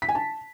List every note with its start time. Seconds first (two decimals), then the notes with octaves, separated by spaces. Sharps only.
0.02 B6
0.09 G#5
0.15 A5